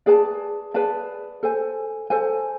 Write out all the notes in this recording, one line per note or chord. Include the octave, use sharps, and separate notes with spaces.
G#4 B4 D5 A5
G#4 B4 D5 A5
A4 C5 G#5
A4 C5 G#5